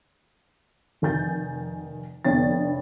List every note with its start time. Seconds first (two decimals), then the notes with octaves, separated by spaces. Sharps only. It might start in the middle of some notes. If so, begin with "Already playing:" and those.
1.02 F1 D#3 G#5 G6 A6
2.25 F1 D3 B3 C#5 G5 A6